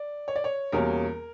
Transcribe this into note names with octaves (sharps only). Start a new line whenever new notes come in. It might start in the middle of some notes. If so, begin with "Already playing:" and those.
Already playing: D5
C#5
D5
C#5
E2 B2 G3 A#3 C#4 A#4